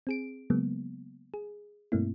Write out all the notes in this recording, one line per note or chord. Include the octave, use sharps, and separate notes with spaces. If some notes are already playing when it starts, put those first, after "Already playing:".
C4 G#4 D7
C#3 F#3 G#3 A#3 B3
G#4
G2 B2 A3 A#3 C4 E4